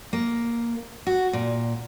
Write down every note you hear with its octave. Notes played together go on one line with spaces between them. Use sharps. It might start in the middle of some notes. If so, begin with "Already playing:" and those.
A#3
F#4
A#2